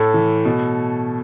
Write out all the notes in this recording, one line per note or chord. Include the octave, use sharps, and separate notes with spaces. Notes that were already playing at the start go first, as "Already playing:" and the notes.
Already playing: A2 A3 A4
E3
B2